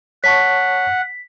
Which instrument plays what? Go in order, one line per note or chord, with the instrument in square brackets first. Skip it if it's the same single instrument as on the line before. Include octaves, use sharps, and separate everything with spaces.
[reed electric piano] C#5 A5 C#6 [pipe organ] F#5 [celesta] B6